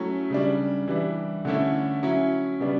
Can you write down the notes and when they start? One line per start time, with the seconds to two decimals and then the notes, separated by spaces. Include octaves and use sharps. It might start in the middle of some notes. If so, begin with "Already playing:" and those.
Already playing: F#3 A3 C#4 E4
0.30 C#3 G3 D4
0.88 E3 G3 D4
1.45 D3 A3 C#4 E4
2.02 F#3 C#4 E4
2.60 C#3 G3 B3 D4